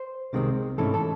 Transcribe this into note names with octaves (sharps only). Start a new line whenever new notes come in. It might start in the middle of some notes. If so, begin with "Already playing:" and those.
Already playing: C5
C2 C3 D#3 G#3 C4
G#2 E3 A3 C#4 A4
A4